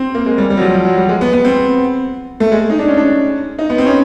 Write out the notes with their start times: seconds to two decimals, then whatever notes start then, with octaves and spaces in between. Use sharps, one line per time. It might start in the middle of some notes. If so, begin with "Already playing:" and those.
Already playing: C4
0.15 A#3
0.26 G#3
0.38 G3
0.50 G3
0.57 F#3
0.62 F3
0.74 F3
0.85 F#3
0.97 G3
1.09 G#3
1.21 B3
1.33 B3
1.45 C4
2.40 A3
2.52 G#3
2.70 D#4
2.79 D4
2.88 C#4
2.97 D4
3.59 D#4
3.70 B3
3.78 C4
3.86 C#4